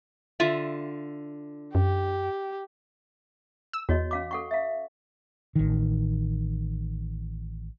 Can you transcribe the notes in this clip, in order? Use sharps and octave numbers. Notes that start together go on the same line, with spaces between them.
D3 F4 E5
F#2 G4
E6
E2 F#4 C#5 D#5
C#4 F5 D6
A4 F#5 C#6
E5 F5
A1 D#3